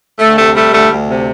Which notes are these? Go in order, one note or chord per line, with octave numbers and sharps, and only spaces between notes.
D2 A3
C3 A3
G3 A3
D2 A3
D2
C3